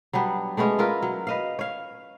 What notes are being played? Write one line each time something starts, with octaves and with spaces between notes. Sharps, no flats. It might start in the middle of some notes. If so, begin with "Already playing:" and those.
F#3 G3 B3 D4
G#3 A3 B3 C#4
E4 F4 A#4 B4
F#3
B4 D#5 F5
C#5 F5